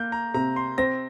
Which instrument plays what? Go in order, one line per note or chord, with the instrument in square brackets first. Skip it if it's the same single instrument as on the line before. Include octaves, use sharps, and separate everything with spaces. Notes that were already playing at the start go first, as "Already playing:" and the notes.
Already playing: [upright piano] A#3 [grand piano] G6
[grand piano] A#5
[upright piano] C3 [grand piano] A#5
[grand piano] C6
[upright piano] C4 [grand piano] A#6